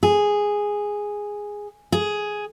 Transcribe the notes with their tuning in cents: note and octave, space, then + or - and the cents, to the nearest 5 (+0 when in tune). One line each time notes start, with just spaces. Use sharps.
G#4 -5
G#4 +5